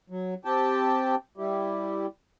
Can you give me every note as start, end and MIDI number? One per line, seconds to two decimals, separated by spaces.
0.10 0.34 54
0.45 1.15 60
0.45 1.15 67
0.45 1.15 79
0.45 1.15 81
1.38 2.06 55
1.38 2.06 64
1.38 2.06 67